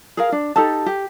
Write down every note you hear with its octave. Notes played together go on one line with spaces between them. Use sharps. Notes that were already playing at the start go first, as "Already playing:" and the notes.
G#4 A#4 F5
D4
D#4 G4 A4 A5
G4